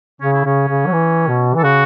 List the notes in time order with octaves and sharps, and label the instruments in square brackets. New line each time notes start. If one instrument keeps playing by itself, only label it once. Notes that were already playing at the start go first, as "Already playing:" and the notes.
[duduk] C#3 [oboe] C#4
[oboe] E4
[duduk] C#3 [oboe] C#4
[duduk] C#3
F#3
E3
B2
[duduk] E3 [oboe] A4
[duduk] C#3 [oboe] F#4